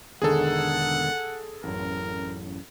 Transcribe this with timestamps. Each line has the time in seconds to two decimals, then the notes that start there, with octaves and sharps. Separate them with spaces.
0.22 E1 D3 D#3 G#4 A4 F#5
1.64 A1 F#2 A#4